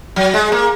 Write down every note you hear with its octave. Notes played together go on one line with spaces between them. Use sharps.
F#3
G#3
A#3